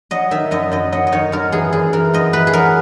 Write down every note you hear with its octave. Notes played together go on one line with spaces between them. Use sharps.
F#3 D#5
D#3 E5
F#2 D#5
F#2 D#5
F#3 D#5
D#5
D#3 C#5
F#2 A#4
E3 G#4
F#2 G#4
E3 A#4
F#2 D#5
E3 B4
G#4
F#3 A#4